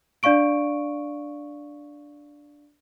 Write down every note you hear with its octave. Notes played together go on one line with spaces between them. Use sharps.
D4 D5 F5 C#6 D7